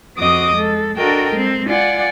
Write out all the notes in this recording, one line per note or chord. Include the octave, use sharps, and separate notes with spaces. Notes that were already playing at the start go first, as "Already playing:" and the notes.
F2 C4 F#4 D#5 D6 D#6
G#3 A4
D4 F#4 A4 A#4 D#5 G5
G#3 C4
F4 D5 F#5 G#5